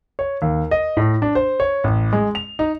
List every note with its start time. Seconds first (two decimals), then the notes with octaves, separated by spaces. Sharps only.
0.19 C#5
0.42 D#2
0.71 D#5
0.97 A2
1.22 D4
1.35 C5
1.60 C#5
1.84 A1
2.13 G#3
2.35 F7
2.59 D#4